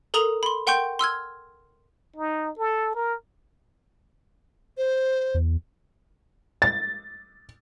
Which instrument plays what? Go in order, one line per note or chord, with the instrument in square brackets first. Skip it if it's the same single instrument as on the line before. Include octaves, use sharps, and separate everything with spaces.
[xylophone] A4 A#4 A#5 D#6 F7 F#7
B5 C6
A#4 F#5 G5 C6 C#6 G6
C6 E6 F6 G#6
[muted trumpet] D#4
A4
A#4
[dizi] C5
[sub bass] E2
[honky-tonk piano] A6